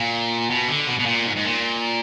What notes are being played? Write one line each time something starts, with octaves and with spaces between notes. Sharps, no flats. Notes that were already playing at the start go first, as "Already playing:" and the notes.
Already playing: A#2
B2
D3
B2
B2
A#2
G#2
G#2
A#2